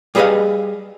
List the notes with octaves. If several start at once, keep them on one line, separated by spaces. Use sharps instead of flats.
G3 G#4 B4 C#5 D#5 F5